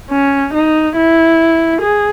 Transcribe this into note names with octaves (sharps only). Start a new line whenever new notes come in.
C#4
D#4
E4
G#4